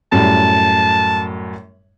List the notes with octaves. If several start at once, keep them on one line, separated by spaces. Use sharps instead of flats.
F#2 A2 G3 A5